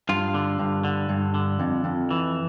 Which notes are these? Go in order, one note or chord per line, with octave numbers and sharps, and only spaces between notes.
G2 F4
D3
G2
D3
G2
D3
F2
F2
E3